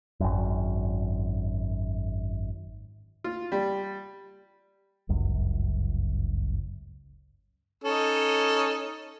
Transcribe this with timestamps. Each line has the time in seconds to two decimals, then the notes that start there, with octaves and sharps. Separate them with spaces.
0.20 G#1 F#2
3.24 F4
3.52 G3
5.09 G1 C#2 F#2
7.84 C#4 D#4 A4